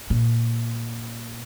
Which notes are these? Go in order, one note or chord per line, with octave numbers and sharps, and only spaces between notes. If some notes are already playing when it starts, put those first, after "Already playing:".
A#2